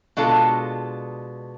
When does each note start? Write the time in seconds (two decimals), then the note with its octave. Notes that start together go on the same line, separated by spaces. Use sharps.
0.17 B2 G#3 D4 F4 A4